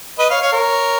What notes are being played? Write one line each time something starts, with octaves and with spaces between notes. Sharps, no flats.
B4 D#5
C#5 F5
C#5 F5
A#4 C#5